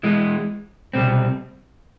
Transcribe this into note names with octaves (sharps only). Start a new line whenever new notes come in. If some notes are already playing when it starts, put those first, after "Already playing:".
E3 G#3 B3
C2 B2 G3 C4